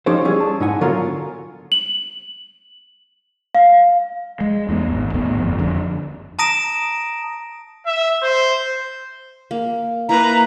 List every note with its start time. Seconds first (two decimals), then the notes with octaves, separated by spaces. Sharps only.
0.06 F3 C#4 D#4 G4 A4 C5
0.25 G3 C#4 E4 G#4
0.40 A5
0.60 G#2 D#4 E4 F#5 G#5
0.81 D3 F#3 B3 F4 A4 A#4
1.72 F#7
3.55 F5
4.41 G#3
4.69 E2 A3 B3
4.91 G#1
5.14 D#2 A2 A3 B3
5.35 G1 F2
5.59 F2 D3
6.39 A5 A#5 D#6 A#6 D7 E7
7.86 E5
8.22 C5
9.51 A#3
10.09 A#3 E4 B4 A#5